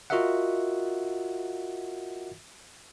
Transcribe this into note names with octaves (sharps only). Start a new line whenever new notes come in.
F4 F#4 A#4 D#5 E5 F#5